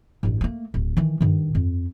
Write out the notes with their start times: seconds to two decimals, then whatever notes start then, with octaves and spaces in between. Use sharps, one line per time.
0.23 A1 G2
0.41 A3 A#3
0.74 D1
0.97 D#3 E3
1.21 G2 D#3
1.55 F2